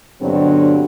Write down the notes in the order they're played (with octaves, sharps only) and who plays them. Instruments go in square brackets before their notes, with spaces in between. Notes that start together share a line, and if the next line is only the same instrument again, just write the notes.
[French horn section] G2 B2 D3 F#3 C4 D4